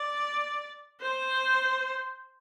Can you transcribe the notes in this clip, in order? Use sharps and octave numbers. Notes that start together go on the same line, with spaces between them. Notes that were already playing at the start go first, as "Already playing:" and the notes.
Already playing: D5
C5